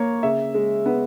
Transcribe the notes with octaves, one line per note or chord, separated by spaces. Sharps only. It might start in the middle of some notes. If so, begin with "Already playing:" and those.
Already playing: A#3 C#5
C#3 E5
G#3
B3